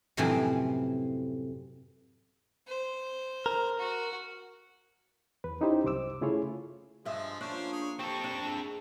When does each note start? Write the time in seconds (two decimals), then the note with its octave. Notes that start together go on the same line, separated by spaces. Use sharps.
0.17 F#2 A2 C3 E3 F3 C4
2.68 C5
3.46 A#4
3.79 F#4
5.44 E2 B4
5.61 C#4 D#4 E4 G4 C5
5.84 C2 F#2 C5 D6 E6
6.21 C#3 A3 E4 F4 G#4 C#5
7.05 G2 F3 G#3 E5
7.41 F3 A#3 C#4 D4 C5
7.72 G#4 C#5
7.99 C4 G4 A4 C#6
8.24 D4
8.44 G#2 G#3